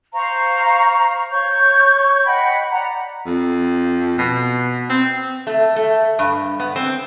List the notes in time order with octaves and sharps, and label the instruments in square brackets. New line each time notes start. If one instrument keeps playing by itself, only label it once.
[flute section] C5 F5 A#5 C#6
C#5 C#6 G6
D#5 F#5 G5 B5
D5 F#5 A#5 B5
[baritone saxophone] F2
B2
C4
[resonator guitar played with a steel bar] A3
A3
G2
B3
C4